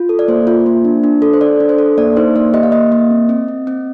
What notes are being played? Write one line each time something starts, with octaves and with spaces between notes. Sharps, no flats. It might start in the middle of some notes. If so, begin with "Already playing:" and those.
Already playing: F4
A4
D5
A#3 C5
F4
A#3
D4
D4
A4
C5
A4 D5
D4
C5
A4
A#3 D5
D#4 C5
A#3 D5
G4 D#5
F5
A#3 D#5
A#3
C4
C4
C4
C4